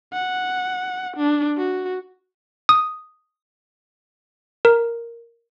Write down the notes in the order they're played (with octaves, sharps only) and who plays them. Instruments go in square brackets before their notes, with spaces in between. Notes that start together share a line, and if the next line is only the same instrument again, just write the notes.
[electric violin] F#5
D4
F#4
[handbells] D#6
A#4